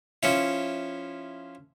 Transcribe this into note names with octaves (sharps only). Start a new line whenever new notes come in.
F3 C#4 E4